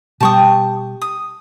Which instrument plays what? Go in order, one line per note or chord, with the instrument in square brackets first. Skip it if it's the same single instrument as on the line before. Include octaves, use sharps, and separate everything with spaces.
[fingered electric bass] B2 G3 [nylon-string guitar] G4 G5 [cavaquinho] A5 C#6 D#6
[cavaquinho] D#6